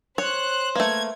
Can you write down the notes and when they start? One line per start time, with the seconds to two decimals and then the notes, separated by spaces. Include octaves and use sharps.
0.18 C5 C#5 F#6
0.75 A3 A#3 B4 E5 G#6